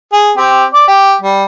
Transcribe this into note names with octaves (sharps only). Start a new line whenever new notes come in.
G#4
C4 G4
D5 D6
G4
G3